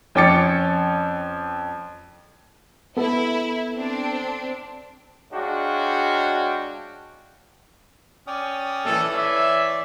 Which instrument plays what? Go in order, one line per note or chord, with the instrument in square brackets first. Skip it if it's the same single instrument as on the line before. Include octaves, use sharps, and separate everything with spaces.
[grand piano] F2 C#4 G5 D6 A6 C#7
[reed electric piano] B3 A4 [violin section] E4
[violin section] C4 D4
[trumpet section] G#3 D4 F#4 C#5 F5 G5
[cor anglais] C#4 [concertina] D5 G5 D#6
[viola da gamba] E3 [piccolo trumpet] A4
[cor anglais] C#5 [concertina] D5 [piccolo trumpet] E5